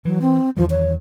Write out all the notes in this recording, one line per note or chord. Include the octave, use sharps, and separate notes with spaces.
E3 F#3
C4
E2 D#3 F3 G3
C#5